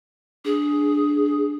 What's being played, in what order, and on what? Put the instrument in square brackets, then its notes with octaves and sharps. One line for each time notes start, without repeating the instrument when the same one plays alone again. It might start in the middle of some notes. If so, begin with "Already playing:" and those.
[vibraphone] D4 [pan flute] G#4